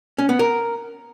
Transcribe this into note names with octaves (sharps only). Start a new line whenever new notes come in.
C#4
B3
A#4